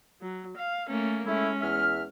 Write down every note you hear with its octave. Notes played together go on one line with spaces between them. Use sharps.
F#3
F5
A3 A#3 C#4
G#3 A3 C#4 E4
E2 E5 F6